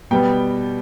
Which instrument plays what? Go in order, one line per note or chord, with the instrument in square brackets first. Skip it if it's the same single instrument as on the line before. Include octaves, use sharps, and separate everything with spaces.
[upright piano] B2 G3 B3 G5